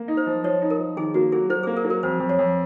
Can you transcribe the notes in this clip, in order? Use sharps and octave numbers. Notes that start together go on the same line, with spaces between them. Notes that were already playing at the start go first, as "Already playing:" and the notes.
Already playing: A#3
D#4
C5
F3
F3 C#5
D#4
A#4
F3
D#3 G#4
A#3 F#4
F#3 G#4
F#3 C5
A#3 G#4
A#4
F#3
A#4
F2 C5
F2
C#5
F2